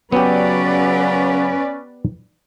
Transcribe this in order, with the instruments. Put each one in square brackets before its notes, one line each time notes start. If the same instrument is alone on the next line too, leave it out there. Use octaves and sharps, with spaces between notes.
[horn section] C#3 F#3 [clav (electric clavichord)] B3 G4 [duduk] C#4 [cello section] B4 D5